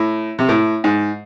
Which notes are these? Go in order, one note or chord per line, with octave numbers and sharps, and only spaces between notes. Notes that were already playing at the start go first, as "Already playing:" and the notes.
Already playing: A2
C3
A2
G#2